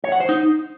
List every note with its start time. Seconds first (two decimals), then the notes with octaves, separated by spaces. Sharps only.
0.04 C#5
0.12 F#5
0.20 C5
0.29 D#4